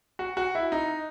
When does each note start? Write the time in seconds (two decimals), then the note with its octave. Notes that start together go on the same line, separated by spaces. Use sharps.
0.19 F#4
0.37 F#4
0.55 E4
0.72 D#4